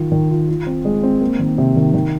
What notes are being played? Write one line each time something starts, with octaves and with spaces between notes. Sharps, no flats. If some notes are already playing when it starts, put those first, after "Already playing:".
Already playing: D#3 F4
D#3
F4
F4
C4
G#3
C4
A#3
D#3
C3
D#3
D#3